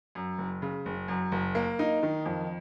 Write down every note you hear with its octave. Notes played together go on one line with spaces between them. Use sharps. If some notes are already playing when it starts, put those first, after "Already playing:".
F#2
F#1
C#3
F#1
F#2
F#1
A#3
D#4
D#3
F2